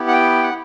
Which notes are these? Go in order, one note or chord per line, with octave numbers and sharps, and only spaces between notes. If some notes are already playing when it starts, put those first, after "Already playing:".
Already playing: B3 E4 G4
F#5
G5
F#5